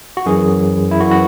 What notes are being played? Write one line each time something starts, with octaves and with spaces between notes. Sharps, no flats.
F#4
F#2 E3 G#4
E4
F#2 E3 F#4
F#4